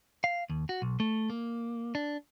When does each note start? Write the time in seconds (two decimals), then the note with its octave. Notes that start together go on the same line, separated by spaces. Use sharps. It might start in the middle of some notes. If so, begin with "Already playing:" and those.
0.24 F5
0.50 D#2
0.69 F#4
0.82 B1
1.00 A3
1.30 A#3
1.95 D4